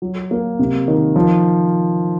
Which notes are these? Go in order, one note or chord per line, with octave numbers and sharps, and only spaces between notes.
F#3
A#3
C3
D#3
F3